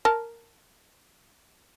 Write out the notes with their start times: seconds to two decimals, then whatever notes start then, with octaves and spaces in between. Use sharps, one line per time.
0.05 A#4 A5